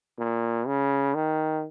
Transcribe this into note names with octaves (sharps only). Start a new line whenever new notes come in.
A#2
C#3
D#3